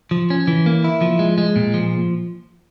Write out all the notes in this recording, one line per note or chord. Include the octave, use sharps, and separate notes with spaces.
F3
C#4
E3
A#3
E4
F3
G#3
G#3
A#2
F3